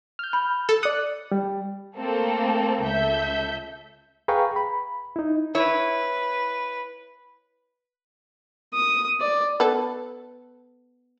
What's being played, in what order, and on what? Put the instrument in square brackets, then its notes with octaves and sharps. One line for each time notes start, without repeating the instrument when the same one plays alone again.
[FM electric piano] F6 G6
[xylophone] B5
[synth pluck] A4
[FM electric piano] D5 F#6 [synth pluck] D#6 [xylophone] C#7
[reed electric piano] G3
[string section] A3 A#3 C4 A4
C#2 A4 E5 G6
[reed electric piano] G#4 B4 F5 G5 A#5 C#6
B5
D#4 E4
[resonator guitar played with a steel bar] E4 C#5 [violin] B4
[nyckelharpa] D#6
D5
[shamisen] B3 A4